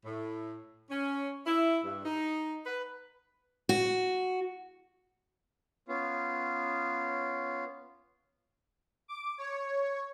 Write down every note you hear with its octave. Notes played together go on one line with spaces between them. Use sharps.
A2
C#4
E4
G2
D#4
B4
F#4
B3 C#4 F4
D6
C#5